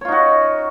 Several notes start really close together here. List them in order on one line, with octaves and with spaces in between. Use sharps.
C#5 F4 D#4 F#4